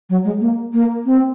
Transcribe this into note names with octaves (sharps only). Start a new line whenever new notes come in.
F#3
G#3
A#3
A#3
C4